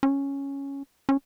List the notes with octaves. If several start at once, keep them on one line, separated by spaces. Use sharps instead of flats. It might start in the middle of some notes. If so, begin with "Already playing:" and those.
C#4
C#4